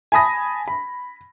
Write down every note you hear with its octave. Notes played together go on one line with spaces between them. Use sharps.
G#5 A5 B5 D#6 A#6
B5